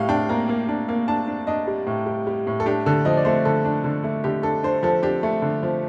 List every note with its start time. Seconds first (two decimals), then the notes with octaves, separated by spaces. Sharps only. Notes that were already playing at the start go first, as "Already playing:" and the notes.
Already playing: A2 G3 F5
0.09 D4 G5
0.29 A#3 A#5
0.49 A#3
0.68 D4
0.89 A#3
1.08 D4 A5
1.28 D4
1.47 D4 D#5
1.67 G3
1.87 A2
2.06 G3
2.27 G3
2.47 A2
2.60 A4
2.66 D4 G4
2.86 D3 A4
3.05 F3 D#5
3.17 D5
3.25 A3 C5
3.45 D3 A4
3.65 D4
3.84 D3
4.04 A3
4.24 D3 G4
4.43 D4 A4
4.63 D4 C5
4.83 F3 A4
5.03 D4 G4
5.23 A3
5.42 D3
5.63 F3